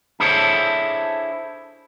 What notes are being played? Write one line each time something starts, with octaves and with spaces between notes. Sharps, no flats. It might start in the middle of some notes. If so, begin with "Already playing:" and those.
D4 E4 G#4 A4 C5 C#5